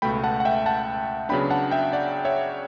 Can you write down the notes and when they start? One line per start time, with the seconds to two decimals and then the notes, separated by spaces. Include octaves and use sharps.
0.02 C#2 B2 A3 G5 B5
0.24 F#5 A5
0.40 F#5
0.45 E5 G5
0.66 F#5 A5
1.29 C#3 F#3 B3 D4 G5 B5
1.50 F#5 A5
1.71 E5 G5
1.93 D5 F#5
2.25 C#5 E5